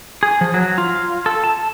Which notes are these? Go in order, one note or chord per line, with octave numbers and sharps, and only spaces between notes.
G#4
F3
F#3
F4
A4
A5